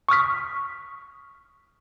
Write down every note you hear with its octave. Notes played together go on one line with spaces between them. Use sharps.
C#6 D#6 F6 B6